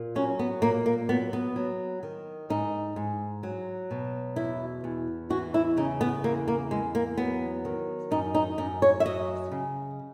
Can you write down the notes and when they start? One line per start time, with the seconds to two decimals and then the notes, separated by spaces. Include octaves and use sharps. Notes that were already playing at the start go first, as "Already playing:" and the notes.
Already playing: A#2
0.15 F#3 C#4
0.39 B3
0.62 A#2 A#3
0.86 A#3
1.09 F#3 B3
1.33 B3
1.56 F#3
2.03 D#3
2.50 G#2 D#4
2.96 G#2
3.43 F#3
3.91 B2
4.36 E2 E4
4.84 E2
5.30 E3 F#4
5.54 E4
5.77 C#3 D#4
6.01 B3
6.24 E2 A#3
6.48 A#3
6.71 E2 G#3
6.95 A#3
7.18 F#3 B3
7.65 D#3
8.11 F#2 D#4
8.35 D#4
8.58 F#2 D#4
8.82 C#5
9.00 E5
9.05 F#3 D#5
9.52 C#3